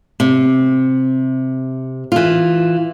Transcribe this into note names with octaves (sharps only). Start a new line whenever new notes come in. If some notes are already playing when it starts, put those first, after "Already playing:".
C3
E3 F4